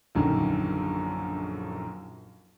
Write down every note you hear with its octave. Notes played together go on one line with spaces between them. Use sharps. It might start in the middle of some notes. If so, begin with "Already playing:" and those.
A#1 F#2 D3 D#3